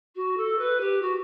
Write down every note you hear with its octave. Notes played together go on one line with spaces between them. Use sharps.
F#4
A4
B4
G4
F#4